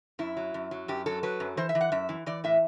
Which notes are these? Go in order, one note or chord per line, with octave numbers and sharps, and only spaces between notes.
F#2 E4
F#3
F#2
F#3
F#2 G4
F#3 A4
F#3 B4
F#2
E3 C5
E5
E3
F#5
F#2 E5
E3
E3 D5
A2 E5